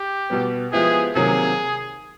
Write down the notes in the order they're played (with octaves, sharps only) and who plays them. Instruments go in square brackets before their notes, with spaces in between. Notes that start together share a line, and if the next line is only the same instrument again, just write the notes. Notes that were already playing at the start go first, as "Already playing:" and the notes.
Already playing: [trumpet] G4
[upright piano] B2 G3 B3
[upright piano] F3 G#3 B3 E4 G4 [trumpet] G#4
[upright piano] C3 D#3 F#3 A#3 [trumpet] G#4